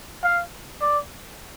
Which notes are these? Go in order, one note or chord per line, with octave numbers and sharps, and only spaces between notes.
F5
D5